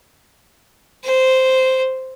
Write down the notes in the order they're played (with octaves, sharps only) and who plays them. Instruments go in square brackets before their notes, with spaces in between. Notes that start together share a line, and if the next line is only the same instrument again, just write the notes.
[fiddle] C5